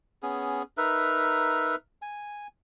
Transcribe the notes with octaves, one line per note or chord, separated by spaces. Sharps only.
B3 C#4 G#4
D#4 A#4 B4 E5
G#5